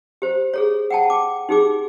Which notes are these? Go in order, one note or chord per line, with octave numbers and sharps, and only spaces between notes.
G4 C5
G#4 A4 C#5
F#5 G5 A5
D6
D#4 G4 G#4 D6